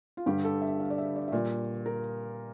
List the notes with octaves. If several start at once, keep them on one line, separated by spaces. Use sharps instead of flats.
F4
G2 D3 G3 G4
A4
E5
F5
D5
E5
D5
E5
A#2 G3 D5
A#4